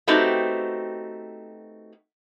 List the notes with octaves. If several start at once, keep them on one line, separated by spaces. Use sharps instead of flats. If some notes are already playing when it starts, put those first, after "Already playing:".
A3 B3 C4 D#4 F#4 G4